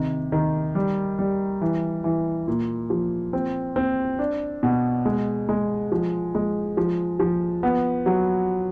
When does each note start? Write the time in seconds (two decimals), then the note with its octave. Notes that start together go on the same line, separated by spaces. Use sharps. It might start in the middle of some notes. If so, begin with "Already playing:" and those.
Already playing: C3 D#3
0.32 D#3
0.75 G3
1.19 G3
1.61 E3
2.04 E3
2.48 A#2
2.90 F3
3.33 C4
3.76 C4
4.19 D4
4.63 B2
5.05 G#3
5.49 G#3
5.92 F3
6.35 G#3
6.77 F3
7.20 F3
7.63 B3
8.06 F#3